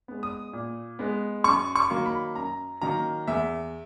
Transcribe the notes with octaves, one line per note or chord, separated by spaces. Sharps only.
G#3 B3
D#6
A#2
G#3 B3
F#2 C#6
C#6
D#3 F#3 A#3
B5
F#2 A#5
D#3 F#3 A#3 A#5
E2 E5